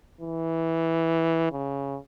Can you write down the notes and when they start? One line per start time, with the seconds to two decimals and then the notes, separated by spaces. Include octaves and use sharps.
0.21 E3
1.52 C#3